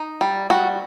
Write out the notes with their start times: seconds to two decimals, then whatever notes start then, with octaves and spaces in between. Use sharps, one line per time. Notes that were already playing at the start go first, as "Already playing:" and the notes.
Already playing: D#4
0.21 G3
0.50 G3 F#4